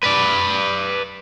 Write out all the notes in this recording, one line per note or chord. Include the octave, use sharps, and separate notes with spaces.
B4 D5